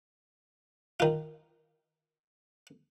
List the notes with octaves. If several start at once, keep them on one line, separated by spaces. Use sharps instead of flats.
D#3 F4